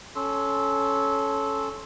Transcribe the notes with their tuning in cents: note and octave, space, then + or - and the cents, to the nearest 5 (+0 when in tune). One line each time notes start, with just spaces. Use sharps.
C#4 +0 A4 -15 C6 +0